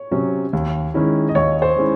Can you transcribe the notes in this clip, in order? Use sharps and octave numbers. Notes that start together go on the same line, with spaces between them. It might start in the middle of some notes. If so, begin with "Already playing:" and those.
Already playing: C#5
C3 F#3 C#4
D#2
D#3 G#3 C#4 E4
D#5
D#2 C#5
C5
D#3 G#3 C#4 E4